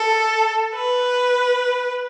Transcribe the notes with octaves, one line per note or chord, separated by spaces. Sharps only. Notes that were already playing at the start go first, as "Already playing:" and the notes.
Already playing: A4
B4